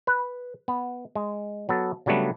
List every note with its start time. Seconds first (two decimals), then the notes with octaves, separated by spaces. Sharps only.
0.07 B4
0.68 B3
1.15 G#3
1.69 F#3 B3 A4
2.06 C#3 F#3 G3 A3 B3 D4